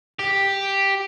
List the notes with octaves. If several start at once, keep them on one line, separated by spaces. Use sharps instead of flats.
G4